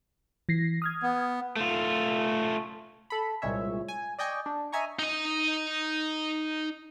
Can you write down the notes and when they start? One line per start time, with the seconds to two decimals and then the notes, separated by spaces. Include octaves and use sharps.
0.49 E3 A#6 C7
0.82 D#6 F6 G#6
1.03 B3
1.56 A3 F4
3.10 A4 B5
3.42 C2 A#2 G#3 C#5 E5
3.88 G#5
4.18 D5 D#5 G5 G#5 C#6
4.46 D4
4.72 D#5 E5 G#5 A#5 C#6
4.99 D#4 D#5